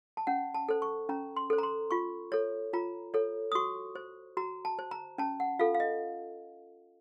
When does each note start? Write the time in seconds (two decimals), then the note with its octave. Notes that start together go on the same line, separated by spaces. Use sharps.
0.17 A5
0.27 C#4 F#5
0.55 A5
0.69 A4 C5
0.82 C#6
1.09 C#4 A#5
1.37 C6
1.50 A4 C5
1.58 A#5
1.63 C6
1.91 F4 C#6
2.32 A4 C#5
2.73 F4 A#5
3.14 A4 C#5
3.52 D#6
3.55 F#4 C#6
3.95 C5
4.37 F#4 A#5
4.65 A5
4.79 C5
4.91 A#5
5.18 C#4 A5
5.40 F#5
5.59 F4 A4 F5
5.75 F5
5.80 D#5